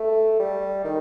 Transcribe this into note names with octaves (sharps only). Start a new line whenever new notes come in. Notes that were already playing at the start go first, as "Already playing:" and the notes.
Already playing: A3
G3
D#3